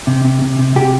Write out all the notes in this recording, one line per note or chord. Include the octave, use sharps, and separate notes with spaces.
C3
C3
C3
C3
C3 G4